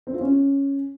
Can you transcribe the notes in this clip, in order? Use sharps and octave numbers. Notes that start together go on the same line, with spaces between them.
C4
F4
C#4